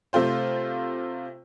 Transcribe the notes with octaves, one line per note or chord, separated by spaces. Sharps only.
C3 A3 F4 C5